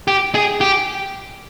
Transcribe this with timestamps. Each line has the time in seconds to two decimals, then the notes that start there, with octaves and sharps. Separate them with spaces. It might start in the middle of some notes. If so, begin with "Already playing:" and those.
0.08 G4
0.35 G#4
0.61 G4